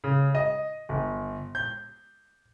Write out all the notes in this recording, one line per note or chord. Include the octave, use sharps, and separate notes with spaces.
C#3
D#5
G1
G6